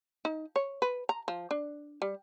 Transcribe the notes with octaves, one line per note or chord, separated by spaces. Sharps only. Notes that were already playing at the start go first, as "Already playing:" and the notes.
D#4
C#5
B4
A#5
F3
D4
G3